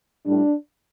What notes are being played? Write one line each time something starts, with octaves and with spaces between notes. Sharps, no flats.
A2 G3 D4